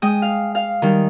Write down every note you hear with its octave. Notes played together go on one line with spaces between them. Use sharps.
G#3 G5 D#6
F5
F5
D#3 G3